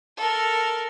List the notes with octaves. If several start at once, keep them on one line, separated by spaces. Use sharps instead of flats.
A4 A#4